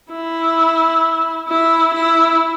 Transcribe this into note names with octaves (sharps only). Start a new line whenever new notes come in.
E4
E4
E4